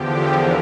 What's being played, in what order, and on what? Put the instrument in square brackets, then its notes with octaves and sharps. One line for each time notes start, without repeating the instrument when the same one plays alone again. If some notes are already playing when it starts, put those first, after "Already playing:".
Already playing: [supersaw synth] E2 D3 F3 G4
A#4